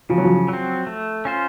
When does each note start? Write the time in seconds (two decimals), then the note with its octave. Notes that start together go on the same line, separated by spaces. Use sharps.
0.09 C#3 F3
0.18 F#3
0.24 F3
0.48 F#3 C4
0.87 A3
1.25 C#4 F4 C5